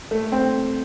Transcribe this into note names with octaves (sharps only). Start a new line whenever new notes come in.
A3
C4